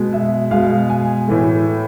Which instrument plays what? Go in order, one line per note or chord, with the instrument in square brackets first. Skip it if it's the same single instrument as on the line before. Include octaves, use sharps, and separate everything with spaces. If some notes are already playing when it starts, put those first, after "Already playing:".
Already playing: [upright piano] B2 G#3
E5
B2 G#3 F5
G#5
A2 E3 A3